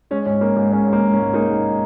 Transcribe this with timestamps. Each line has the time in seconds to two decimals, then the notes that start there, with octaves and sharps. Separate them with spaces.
0.11 G#3 C#4
0.26 G#2 C#4
0.41 G#3 A#3
0.57 G#2 A#3
0.72 G#3 C#4
0.88 G#3
0.93 A#3
1.03 G#2
1.13 C#4
1.18 G#2
1.33 G#3 A#3 D#4
1.49 G#3